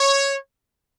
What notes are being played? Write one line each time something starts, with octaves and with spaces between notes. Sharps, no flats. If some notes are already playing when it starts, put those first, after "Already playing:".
Already playing: C#5